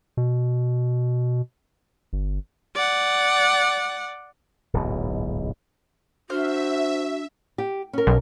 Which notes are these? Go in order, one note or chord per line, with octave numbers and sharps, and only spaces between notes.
B2
G1
D5 F#5
D1 B1 G#2 B2
D4 F#4 C5 E5 F6
G4
C#4 A#4
B1